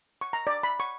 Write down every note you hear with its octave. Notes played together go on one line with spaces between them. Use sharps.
C#6
A#5
D5
B5
C#6